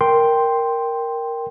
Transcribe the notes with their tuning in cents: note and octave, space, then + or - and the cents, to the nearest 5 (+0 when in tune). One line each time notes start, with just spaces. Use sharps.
A#4 +0 G5 +0 C6 +0